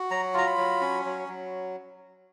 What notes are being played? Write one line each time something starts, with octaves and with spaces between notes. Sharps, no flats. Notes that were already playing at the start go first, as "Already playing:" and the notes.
Already playing: F#4
F#3 A#5
F4 A#5
B5
F#3
C#4
F#3
F#3